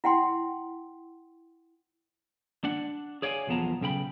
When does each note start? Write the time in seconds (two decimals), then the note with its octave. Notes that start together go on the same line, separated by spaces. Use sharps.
0.04 E4 F#5 G5 C6
2.64 D4 F#5
3.22 G#4 C#5 D5 F5 G5 G#5
3.47 B1 E2 F3 B3 A5 A#5
3.81 B1 C#3 G5 B5